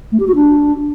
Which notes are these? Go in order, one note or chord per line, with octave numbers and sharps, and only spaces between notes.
A3
G4
F#4
D4